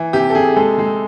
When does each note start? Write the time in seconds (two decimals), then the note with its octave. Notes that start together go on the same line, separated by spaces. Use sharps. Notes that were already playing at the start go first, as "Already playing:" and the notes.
Already playing: E3
0.13 C3 G4
0.30 A4
0.35 C3 G#4
0.56 G#3 A4
0.79 G#3